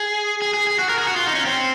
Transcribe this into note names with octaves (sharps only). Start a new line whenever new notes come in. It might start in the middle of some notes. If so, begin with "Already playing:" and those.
Already playing: G#4
G#4
G#4
G#4
F#4
A#4
G#4
F#4
F4
D#4
C#4
C4